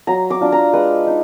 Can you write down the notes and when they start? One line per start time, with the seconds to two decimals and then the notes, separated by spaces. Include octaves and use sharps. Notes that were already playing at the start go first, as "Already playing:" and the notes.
0.07 F#3 A#5
0.30 D6
0.41 D4 F4
0.52 A#5
0.73 G#3 B4
1.07 D#4